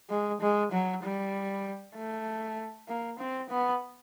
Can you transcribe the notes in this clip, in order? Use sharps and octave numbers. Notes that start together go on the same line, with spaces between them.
G#3
G#3
F#3
G3
A3
A#3
C4
B3